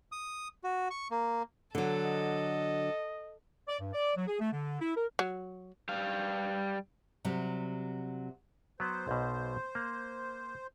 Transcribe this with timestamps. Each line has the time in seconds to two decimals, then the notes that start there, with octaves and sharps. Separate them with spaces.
0.12 D#6
0.64 F#4
0.90 C#6
1.11 A#3
1.75 D3 F#3 A4
2.06 D#5
3.68 D5
3.80 G2
3.93 D5
4.16 F#3
4.27 G#4
4.40 A3
4.52 D3
4.80 E4
4.96 A#4
5.19 F#3
5.89 G3 F5
7.25 C3 F#3 G3
8.80 F#3 B3 C5
9.08 B1 B2
9.75 A#3